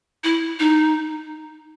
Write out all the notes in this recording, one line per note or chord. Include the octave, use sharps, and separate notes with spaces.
E4
D#4